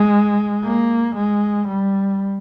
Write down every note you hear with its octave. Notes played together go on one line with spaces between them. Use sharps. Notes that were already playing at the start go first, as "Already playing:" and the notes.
Already playing: G#3
A#3
G#3
G3